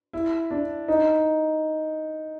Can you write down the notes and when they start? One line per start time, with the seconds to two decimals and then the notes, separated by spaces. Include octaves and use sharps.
0.13 E4
0.51 D4
0.88 D#4